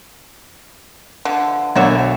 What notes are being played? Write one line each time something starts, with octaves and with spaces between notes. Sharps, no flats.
D3 E3 F3
B1 A#3 D4 F#4 C#5 E5